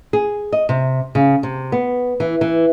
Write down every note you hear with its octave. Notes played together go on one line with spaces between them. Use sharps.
G#4
D#5
C3
C#3
C3
B3
E3
E3